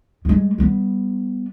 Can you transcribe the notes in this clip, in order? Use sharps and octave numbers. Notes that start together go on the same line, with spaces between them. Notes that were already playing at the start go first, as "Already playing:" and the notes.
G3 G#3
G3 B3